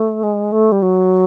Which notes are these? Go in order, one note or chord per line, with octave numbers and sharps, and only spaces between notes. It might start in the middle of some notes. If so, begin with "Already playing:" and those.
Already playing: A3
G#3
A3
G3
F#3